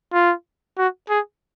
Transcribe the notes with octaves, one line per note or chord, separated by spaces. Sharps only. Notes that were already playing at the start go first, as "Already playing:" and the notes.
F4
F#4
G#4